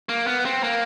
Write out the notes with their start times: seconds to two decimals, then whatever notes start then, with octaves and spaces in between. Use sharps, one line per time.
0.09 A#3
0.27 B3
0.45 C4
0.64 A#3